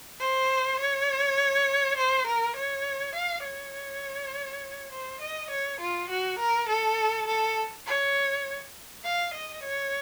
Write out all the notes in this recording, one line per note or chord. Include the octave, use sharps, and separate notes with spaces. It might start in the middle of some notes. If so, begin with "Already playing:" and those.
C5
C#5
C5
A#4
C#5
F5
C#5
C5
D#5
C#5
F4
F#4
A#4
A4
A4
C#5
F5
D#5
C#5